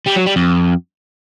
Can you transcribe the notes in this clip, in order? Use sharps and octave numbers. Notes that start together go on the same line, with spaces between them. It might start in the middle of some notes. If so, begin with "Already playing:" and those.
G3
F#3
G3
F2